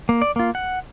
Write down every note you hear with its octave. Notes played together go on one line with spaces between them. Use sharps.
A#3
D5
A#3 F4
F#5